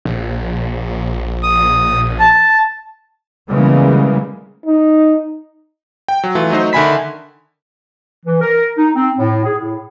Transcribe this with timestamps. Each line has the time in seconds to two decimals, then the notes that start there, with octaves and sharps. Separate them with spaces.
0.05 A#1
1.43 D#6
2.19 A5
3.48 C#3 E3 G3 G#3 A#3 B3
4.66 D#4
6.08 G5
6.24 F#3
6.35 E3 A3 F4
6.50 F#3 A3 D#4 C5
6.73 D3 D#3 E5 G#5 B5 B6
8.26 E3
8.41 A#4
8.78 D#4
8.96 C4
9.18 A2
9.45 G#4
9.59 A2